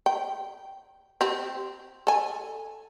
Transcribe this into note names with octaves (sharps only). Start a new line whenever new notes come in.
G5
C4 G4
A4 G#5